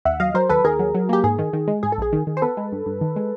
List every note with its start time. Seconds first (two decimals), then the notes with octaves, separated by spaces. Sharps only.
0.05 D#2 E5 F#5
0.20 F#3 D#5 F5
0.34 F#3 A#4 C5
0.49 D#2 A4 B4
0.65 D#2 G#4 A#4
0.79 F#3
0.95 F#3
1.09 A#3 G4
1.24 G#2 G#4
1.38 D#3
1.53 D#3
1.68 G#3
1.83 G#2 G#4
1.92 A4
1.98 A#1 G#4
2.13 D#3
2.27 D#3
2.37 C5
2.42 B3 A4 B4
2.57 G#3
2.72 G2
2.86 G2
3.01 D#3
3.16 G#3